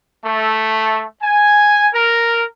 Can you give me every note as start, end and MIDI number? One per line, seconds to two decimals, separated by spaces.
0.24 1.05 57
1.23 1.88 80
1.94 2.43 70